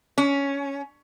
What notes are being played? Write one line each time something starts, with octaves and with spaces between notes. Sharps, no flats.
C#4